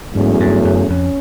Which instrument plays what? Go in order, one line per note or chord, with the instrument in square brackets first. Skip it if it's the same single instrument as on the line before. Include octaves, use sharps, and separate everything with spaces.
[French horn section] E2 C#3 F#3 A3 C#4 [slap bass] G#2
[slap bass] G2
F#2
[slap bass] F2 [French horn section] C#4